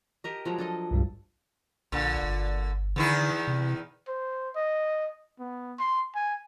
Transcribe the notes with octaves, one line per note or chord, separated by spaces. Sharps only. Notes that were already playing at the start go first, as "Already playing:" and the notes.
G4 A#4 D#5
F3 F#3 G#3
D4 A4 D#5
C2 G2 G3
A#1 A#2 D3
G1
E2 D3 D#3 E4
C3
C5
D#5
B3
C6
G#5